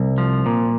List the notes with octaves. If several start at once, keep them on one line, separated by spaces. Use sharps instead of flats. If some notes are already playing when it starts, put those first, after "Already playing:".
Already playing: C2
F3
A#2